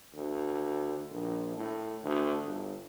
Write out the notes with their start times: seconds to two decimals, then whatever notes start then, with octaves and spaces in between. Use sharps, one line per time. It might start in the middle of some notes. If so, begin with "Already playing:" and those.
0.14 D2
1.11 A#1
1.57 A2
2.03 D2
2.44 G1